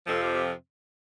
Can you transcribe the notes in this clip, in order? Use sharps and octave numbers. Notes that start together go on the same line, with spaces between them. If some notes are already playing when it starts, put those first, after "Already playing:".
F2 C3 F3 C4 A4
G4
G4